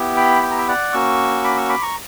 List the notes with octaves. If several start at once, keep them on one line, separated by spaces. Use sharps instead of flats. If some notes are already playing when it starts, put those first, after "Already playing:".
Already playing: B3 E4 G4
G5 B5
G5
A#5
E5 G5
D5 F#5
A#3 C#4 F#4 C#6 E6
B5 D6
C#6 E6
B5 D6
A#5 C#6